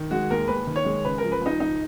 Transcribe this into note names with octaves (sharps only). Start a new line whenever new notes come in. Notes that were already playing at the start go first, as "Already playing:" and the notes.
Already playing: D#3
G#3 F#4
D#2 A#4
D#2 B4
D#3
C#5
G#3
C#3 B4
F3 A#4
B4
C#2 D#4
C#2 D#4